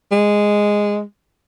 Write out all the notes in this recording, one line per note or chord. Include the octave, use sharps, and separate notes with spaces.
G#3